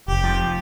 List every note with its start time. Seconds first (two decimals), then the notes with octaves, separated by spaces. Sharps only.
0.08 F1 G4
0.24 F3